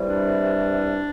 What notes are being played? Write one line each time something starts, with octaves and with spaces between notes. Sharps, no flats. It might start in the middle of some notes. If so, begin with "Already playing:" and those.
Already playing: C2 C3 E3 G3
D4